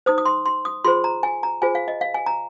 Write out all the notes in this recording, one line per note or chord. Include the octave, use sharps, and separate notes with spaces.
D#4 C5 D#6
D#6
C6
C6
D#6
F4 G#4 C5 C6
A#5
G#5
A#5
F4 G#4 C5 G#5
F5
D#5
F5
G#5
A#5